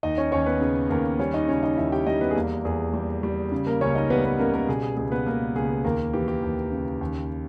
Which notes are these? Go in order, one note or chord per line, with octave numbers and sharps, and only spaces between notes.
D#2 D#4 D#5
C#4 C#5
D#2 C#4 C#5
B3 B4
C#3 G#4
D#2 A#3 A#4
G3 C#4 C#5
D#4 D#5
C#3 C#4 C#5
D#4 D#5
D#2 E4 E5
G4 G5
G3 D#4 D#5
B3 B4
G#4
E2 A#3 A#4
E2 G#4
G3
G3
C#3
A#3 A#4
C#2 C#4 C#5
D#4 D#5
G3 B3 B4
B3 B4
C#3 A#3 A#4
A#3 A#4
B2 G#4
G#4
C#2 G#4
B3 B4
C#2 A#3 A#4
C#2 G#4
D#2 A#3 A#4
E3 G4
G4
D#2
C#3
D#2